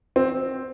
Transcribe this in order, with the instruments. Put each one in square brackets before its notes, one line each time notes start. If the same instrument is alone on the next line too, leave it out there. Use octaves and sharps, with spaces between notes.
[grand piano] C4